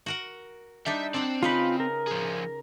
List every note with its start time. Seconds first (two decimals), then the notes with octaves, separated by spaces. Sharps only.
0.06 F#4 A#4 F#5
0.86 G3 D4 D#4 E5
1.14 C4 D4 F#5
1.43 C#3 D#4 F4 B4 B5
1.80 A#4
2.07 F3 G#4